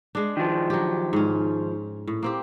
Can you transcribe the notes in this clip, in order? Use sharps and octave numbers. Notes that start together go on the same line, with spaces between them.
G#3 D4
D#3 F3
F#3 G4
G#2 C#4
A2
A#3 C4 G4